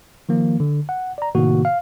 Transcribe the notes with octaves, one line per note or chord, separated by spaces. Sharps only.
D#3 F3 A#3
D3
F#5
D5 A#5
A2 C3 D#3 A#3 F#4
F5